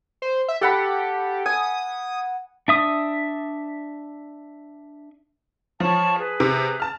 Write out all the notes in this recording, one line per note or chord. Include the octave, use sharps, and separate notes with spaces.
C5
E5
G4 A4 F#5 B5
G#5 D#6
D4 E5 D#6
F3 C#5 A5 C#6
G#4 B4
C3
A5 F6